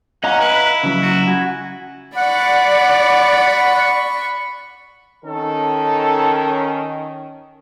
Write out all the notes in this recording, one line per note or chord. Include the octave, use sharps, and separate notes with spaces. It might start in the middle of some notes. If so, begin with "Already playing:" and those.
C#4 D#5 F5 F#5 A#5
E4 B4
C#3 F#3
F#4
F#4 G#5
D5 F#5 B5 C#6
D#3 C#4 A4